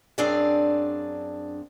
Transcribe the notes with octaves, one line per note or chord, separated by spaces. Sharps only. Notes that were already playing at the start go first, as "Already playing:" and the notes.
F#2 C4 D4 G#4 D5 F5